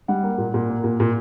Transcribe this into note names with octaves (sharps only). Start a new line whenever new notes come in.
G3 F#5
A#3
A#2
A#2
A#3
A#2
A#2